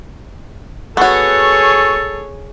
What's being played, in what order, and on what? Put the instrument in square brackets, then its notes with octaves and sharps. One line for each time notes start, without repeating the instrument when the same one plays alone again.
[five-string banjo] B3 F#4 [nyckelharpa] G#4 C#5 [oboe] A4 [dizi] C#6